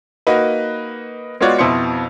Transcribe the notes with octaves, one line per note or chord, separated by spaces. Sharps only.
A#3 D#4 F#4 B4
G#3 B3 F4 F#4 C#5 D5
F2 B2 C4 E4 C5 C#7